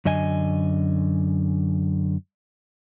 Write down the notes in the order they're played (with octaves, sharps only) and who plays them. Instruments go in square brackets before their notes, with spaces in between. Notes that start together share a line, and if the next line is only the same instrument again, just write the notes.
[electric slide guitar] F#2 D3 D#5 G#5